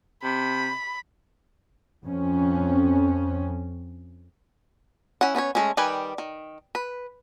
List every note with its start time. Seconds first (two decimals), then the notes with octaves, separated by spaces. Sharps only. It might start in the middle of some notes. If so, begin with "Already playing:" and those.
0.23 C3 B5
2.06 F2 C#4
5.21 C#4 E4 F#5
5.35 B3 C#4 C5 C#5
5.55 G#3 A3 C#4
5.77 D#3 G3 G4 B4 G#5
6.18 D#3
6.75 B4